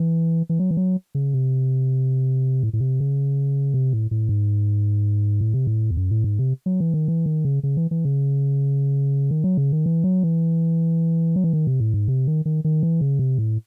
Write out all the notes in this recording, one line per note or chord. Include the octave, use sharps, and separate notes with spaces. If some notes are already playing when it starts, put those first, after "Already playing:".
Already playing: E3
E3
F#3
E3
F#3
C#3
C3
A2
A2
C3
C#3
C3
A2
A2
G#2
A2
C3
A2
E2
F#2
A2
G#2
C3
F#3
E3
D#3
E3
D#3
C#3
C#3
E3
E3
C#3
D#3
F#3
C#3
D#3
E3
F#3
E3
F#3
E3
D#3
C3
A2
G#2
C3
D#3
D#3
D#3
E3
C#3
C3
A2